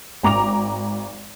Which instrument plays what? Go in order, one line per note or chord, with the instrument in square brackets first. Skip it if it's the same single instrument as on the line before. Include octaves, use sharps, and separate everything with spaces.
[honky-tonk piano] G#1 A#5 D6 F7